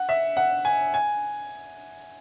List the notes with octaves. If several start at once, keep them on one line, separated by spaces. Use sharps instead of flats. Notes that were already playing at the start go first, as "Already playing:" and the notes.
Already playing: F#5
E5
F#5
G#5
G#5